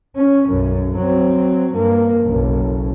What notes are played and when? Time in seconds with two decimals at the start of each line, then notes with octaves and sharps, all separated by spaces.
0.15 C#4
0.48 B1 F#2
0.97 F#3 C4
1.71 G2 A#3
2.25 F#1 B1